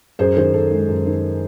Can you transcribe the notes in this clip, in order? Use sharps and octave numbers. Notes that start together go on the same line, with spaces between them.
F#2 G#4 C5
D#3 G#4 C5
F#2 A4
G#3
F#2
D#3